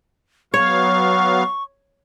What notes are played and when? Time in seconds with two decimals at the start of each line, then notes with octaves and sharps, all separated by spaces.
0.54 F#3 B3 C#5 F5 C#6